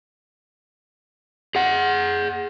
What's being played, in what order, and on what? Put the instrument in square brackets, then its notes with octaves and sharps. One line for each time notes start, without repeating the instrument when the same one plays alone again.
[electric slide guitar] G#4 F#5